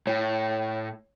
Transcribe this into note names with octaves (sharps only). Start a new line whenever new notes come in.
A2 C#5 G5